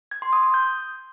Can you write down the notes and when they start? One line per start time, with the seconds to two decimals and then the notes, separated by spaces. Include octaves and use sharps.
0.11 G#6
0.22 C6
0.33 D#6
0.43 D#6
0.54 G6